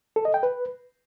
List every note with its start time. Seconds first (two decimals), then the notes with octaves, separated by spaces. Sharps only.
0.16 A4
0.25 D#5
0.34 G5
0.43 B4